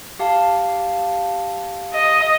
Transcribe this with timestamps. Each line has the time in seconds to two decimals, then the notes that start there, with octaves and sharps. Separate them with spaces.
0.19 G4 F5 A5
1.94 D#5